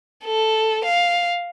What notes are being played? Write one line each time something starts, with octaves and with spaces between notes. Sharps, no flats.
A4
F5